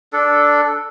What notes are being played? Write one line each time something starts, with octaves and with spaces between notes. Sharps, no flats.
D4 A4